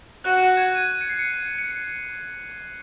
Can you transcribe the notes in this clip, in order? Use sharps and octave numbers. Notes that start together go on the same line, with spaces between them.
F#4 F#6
F#6
G#6
D#7
D#7
C#7
C7
C#7
C#7